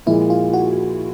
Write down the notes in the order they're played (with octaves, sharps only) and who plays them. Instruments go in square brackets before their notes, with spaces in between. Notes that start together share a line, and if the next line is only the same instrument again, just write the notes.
[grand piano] A#2 F3 G#3 [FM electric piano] E4
[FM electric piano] F4
F#4